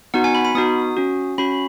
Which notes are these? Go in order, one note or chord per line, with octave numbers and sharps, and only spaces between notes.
B3 D#4 F#4 F#5
G#5
B5
B5
B3 D#4 F#4 D#6
C#4 F#4
C#4 F#4 B5